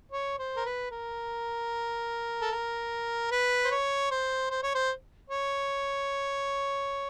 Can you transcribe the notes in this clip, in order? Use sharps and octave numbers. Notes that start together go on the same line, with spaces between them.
C#5
C5
A#4
B4
A#4
A4
A#4
B4
C5
C#5
C5
C5
C#5
C5
C#5